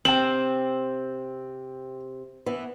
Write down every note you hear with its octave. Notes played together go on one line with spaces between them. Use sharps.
C3 C4 G5 F#7
E3 B3 E4